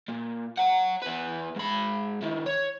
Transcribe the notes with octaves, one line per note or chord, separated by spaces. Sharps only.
A#2
C#5 F#5
E2 B4
G#2 B5
D#3 E4
C#5